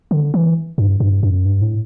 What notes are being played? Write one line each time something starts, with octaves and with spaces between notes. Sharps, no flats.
D3
E3
G2
G2
F#2
G2
A2